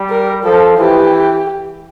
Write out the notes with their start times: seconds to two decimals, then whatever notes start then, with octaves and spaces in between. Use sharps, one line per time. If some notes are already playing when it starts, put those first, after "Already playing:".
Already playing: G3
0.10 A#4
0.44 F3 A4
0.77 E3 G4